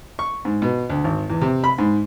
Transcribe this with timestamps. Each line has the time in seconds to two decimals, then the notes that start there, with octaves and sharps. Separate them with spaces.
0.19 C#6
0.45 G#2
0.62 B2
0.90 D2
1.04 G#1
1.30 E2
1.41 C3
1.64 B5
1.78 G#2